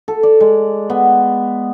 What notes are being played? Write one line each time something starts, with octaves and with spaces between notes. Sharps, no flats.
A4
D5
G#3
B3